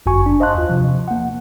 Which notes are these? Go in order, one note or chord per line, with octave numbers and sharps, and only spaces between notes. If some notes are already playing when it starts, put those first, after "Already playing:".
G1 F#2 F#4 G#5 C#6
D4
C5 D#5 F5 A5 C6 F#6
D#2 F4
C3 F3
A#3 F#5